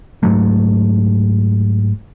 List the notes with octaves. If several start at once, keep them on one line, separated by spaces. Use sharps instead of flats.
G#2 F#3 A3